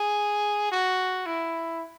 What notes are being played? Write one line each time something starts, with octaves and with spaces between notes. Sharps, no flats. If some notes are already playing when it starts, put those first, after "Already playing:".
Already playing: G#4
F#4
E4